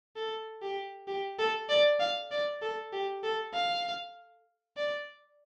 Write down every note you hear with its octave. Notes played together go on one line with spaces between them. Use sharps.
A4
G4
G4
A4
D5
F5
D5
A4
G4
A4
F5
D5